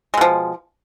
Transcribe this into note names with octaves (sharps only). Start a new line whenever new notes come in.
B2 F3 G#3